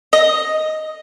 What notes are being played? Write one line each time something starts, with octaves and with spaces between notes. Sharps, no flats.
D#5